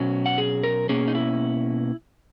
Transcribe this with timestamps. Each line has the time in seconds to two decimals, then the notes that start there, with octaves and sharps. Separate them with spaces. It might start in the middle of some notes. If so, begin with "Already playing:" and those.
Already playing: B2 F#3 C#4
0.26 F#5
0.38 G#4
0.63 A#4
0.89 B2 A#3 C#4 G#4
1.08 D#4
1.15 E4